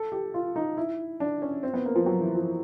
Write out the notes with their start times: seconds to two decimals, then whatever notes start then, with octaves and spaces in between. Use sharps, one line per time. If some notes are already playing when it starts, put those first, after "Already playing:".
Already playing: A4
0.12 G4
0.34 F4
0.56 D#4
0.77 E4
1.20 D4
1.42 C#4
1.63 C4
1.74 B3
1.85 A#3
1.96 F3
2.06 F#3
2.21 E3
2.35 F3